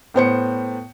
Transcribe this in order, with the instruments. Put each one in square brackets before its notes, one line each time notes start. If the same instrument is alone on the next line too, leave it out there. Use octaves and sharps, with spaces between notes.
[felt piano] A2 B3 C5 C#7